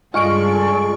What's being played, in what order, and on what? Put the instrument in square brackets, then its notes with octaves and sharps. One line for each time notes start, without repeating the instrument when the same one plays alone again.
[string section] C#2 G2 [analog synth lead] G#3 [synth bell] F4 C#6 D7 [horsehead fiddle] A4 D5